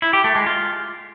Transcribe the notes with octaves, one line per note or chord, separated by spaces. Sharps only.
E4
G4
A3
G#3
F4